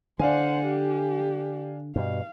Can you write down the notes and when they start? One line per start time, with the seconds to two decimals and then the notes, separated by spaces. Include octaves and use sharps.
0.19 D3 D4 C5 F5 F#5 G#5
0.65 G4
1.96 G2 B2 F5